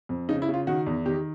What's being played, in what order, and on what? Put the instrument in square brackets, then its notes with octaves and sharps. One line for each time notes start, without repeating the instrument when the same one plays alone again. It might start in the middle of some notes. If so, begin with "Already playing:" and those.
[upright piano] F2
C#3 D#4
E4
C#3
F4
D#3 F#4
E2
D#3 G4